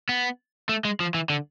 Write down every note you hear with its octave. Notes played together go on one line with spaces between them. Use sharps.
B3
A3
G#3
F3
E3
D3